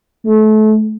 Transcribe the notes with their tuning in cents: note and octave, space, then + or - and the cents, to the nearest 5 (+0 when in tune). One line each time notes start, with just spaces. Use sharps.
A3 -30